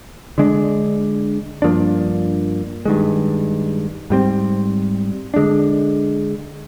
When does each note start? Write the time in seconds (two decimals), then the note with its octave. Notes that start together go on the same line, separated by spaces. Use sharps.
0.38 D3 G#3 D4
1.62 G2 F3 A#3 D4
2.85 G2 D#3 G#3
4.10 G#2 G3 C4
5.34 D3 G#3 D4